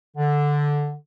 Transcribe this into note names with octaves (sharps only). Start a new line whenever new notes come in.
D3